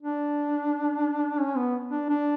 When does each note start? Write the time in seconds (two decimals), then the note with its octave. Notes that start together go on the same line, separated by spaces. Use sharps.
0.02 D4
1.40 C#4
1.57 B3
1.91 D4
2.09 D4